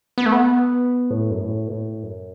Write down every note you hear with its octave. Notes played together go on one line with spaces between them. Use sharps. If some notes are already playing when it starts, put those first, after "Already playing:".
B3
A3
B3
A2
F#2
A2
B2
A2
F#2